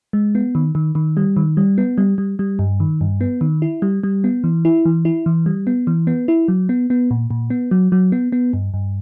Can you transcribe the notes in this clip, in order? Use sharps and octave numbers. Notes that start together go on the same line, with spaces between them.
G#3
B3
D#3
D#3
D#3
G3
D#3
G3
B3
G3
G3
G3
G2
D#3
G2
B3
D#3
E4
G3
G3
B3
E3
E4
E3
E4
E3
G3
B3
E3
B3
E4
F#3
B3
B3
A#2
A#2
B3
F#3
F#3
B3
B3
G2
G2